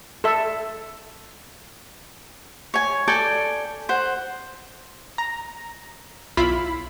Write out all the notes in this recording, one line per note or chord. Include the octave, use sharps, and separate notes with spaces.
A4 E5
C#5 G#5
A4 D5 G5 G#5
C5 F#5
A#5
B1 E4 F4 B5